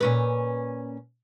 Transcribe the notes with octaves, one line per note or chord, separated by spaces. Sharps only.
A#2 C#4 B4